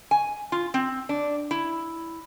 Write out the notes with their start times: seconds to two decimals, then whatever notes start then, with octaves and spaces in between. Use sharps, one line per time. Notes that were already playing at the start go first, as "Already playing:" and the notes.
0.11 G#5
0.52 F4
0.74 C4
1.09 D4
1.51 E4